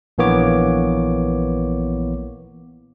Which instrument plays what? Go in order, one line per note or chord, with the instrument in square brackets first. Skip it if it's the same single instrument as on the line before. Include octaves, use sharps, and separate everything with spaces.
[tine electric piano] A#1 E3 A#3 B3 C#5 D6